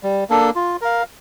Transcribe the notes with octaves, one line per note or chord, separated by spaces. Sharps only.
G3
A#3 D4 A4
F4
A#4 F5